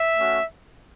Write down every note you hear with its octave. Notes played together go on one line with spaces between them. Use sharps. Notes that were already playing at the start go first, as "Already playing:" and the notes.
Already playing: E5
A3 C#4 F#4